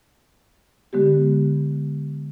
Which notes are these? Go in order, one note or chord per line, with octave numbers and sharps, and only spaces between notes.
D3 G#3 B3 G4